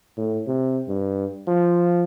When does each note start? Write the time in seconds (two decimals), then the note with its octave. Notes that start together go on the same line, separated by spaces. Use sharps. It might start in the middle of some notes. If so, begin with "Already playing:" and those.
0.17 A2
0.47 C3
0.88 G2
1.48 F3